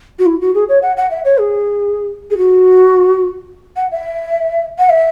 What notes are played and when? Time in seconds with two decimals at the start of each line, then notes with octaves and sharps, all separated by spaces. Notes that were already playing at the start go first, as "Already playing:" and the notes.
0.18 F#4
0.25 E4
0.40 F#4
0.54 G#4
0.68 C#5
0.82 F#5
0.96 F#5
1.10 E5
1.24 C#5
1.38 G#4
2.30 G#4
2.37 F#4
3.76 F#5
3.91 E5
4.78 F#5
4.89 E5